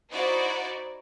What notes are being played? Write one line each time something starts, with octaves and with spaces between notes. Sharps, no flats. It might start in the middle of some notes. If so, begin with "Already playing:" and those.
D#4 E4 F#4 C5 D5